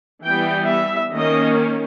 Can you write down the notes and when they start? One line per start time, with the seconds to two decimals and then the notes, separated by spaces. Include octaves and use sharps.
0.23 E3 G3 B3 G5
0.68 E5
1.13 D#3 A#3 C#4 D#5